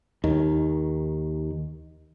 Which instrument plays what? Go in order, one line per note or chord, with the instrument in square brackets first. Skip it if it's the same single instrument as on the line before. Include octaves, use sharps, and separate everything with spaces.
[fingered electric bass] D#2 D#3